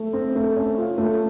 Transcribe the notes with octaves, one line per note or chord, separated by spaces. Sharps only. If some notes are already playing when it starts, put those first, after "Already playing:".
Already playing: A3
C4
A3
C#4
F4
A3